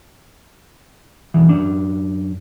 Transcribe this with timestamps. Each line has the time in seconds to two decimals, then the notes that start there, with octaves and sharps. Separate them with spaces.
1.34 B1 E2 E3
1.49 F#2 D4